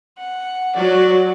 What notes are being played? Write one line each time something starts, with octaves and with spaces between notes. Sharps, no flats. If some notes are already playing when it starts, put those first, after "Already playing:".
F#5
F#3 F#4 D5